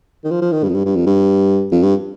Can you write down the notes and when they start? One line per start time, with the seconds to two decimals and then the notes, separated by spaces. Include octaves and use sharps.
0.24 D#3
0.31 F3
0.41 F3
0.52 D#3
0.63 G2
0.69 F2
0.74 G2
0.86 G2
0.95 F2
1.06 G2
1.72 F2
1.83 G2